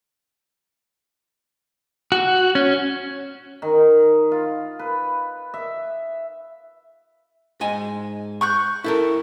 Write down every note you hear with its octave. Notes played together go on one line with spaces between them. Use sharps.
F#4
C#4
D#3
F4
B4
E5
G#2 D#5 G#5
C#6 F#6 G6
E4 A4 A#4